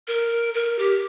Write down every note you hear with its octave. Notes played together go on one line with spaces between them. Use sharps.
A#4
A#4
G4